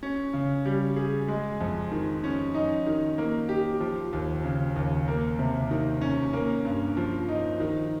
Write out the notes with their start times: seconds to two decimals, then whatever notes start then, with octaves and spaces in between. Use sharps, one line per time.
0.03 C#4
0.33 C#3
0.66 G3
0.96 G#4
1.28 G#3
1.61 F2
1.92 D#3
2.24 C#4
2.54 D#4
2.86 D#3
3.18 A#3
3.49 G4
3.80 F3
4.13 D#2
4.44 C#3
4.76 D#2
5.08 A#3
5.39 C3
5.71 D#3
6.01 C#4
6.33 A#3
6.65 G2
6.97 F3
7.29 D#4
7.60 D#3